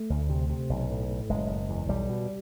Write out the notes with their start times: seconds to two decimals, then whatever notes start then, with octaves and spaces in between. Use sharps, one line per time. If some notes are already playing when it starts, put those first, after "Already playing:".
Already playing: A3
0.10 D2
0.30 C3
0.50 C3
0.69 B1
0.90 A2
1.09 A2
1.29 F#1 G#3
1.49 F#1
1.70 E2
1.89 B1 G3
2.09 B2